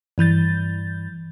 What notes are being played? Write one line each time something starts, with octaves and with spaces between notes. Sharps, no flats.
G2 E3 G6 A6